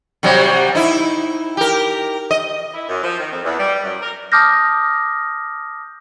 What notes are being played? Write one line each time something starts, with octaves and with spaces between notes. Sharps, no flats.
C3 F#3 G3
D#4 E4
G4 A#4
D#5
E4
F#2
F3
D#3
F2
E2
G3
F#2
A#4
A5 D6 D#6 F6 G6 A#6